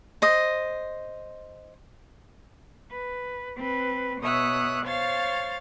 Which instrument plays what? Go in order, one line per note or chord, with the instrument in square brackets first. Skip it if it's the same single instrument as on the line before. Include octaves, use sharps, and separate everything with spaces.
[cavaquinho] C5 D#5
[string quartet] B4
C4 B4
B2 C#5 E5 D#6 F#6
C5 C#5 F5 A6